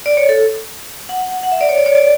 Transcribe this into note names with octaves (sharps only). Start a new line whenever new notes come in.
D5
C#5
A4
F#5
F#5
E5
D5
C#5
D5
C#5
D5